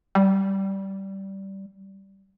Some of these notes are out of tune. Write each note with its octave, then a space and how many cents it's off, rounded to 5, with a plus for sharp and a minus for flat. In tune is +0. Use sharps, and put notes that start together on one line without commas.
G3 -15